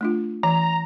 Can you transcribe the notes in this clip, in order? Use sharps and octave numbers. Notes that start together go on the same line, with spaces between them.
A3 D4 F4
E3 A#5